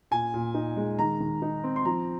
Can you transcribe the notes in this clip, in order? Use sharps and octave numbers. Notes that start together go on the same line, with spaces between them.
A#2 G#5
A#2
D#4
G#3
D#3 A#5
D#3
D#4
C4
C6
F3 A#5